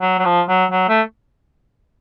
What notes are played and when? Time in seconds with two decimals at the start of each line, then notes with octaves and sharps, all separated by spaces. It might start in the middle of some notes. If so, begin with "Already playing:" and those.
0.01 F#3
0.19 F#3
0.25 F3
0.48 F#3
0.71 F#3
0.89 A3